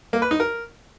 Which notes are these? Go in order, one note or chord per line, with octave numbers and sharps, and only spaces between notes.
A#3
B4
D#4
A#4